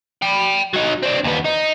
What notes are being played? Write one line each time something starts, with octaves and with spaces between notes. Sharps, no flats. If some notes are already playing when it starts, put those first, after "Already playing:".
G5 B5
F#3 D#4
C4 D4
D#2 B3
D#4